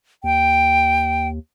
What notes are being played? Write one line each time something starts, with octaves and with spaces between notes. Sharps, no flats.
D#2 G5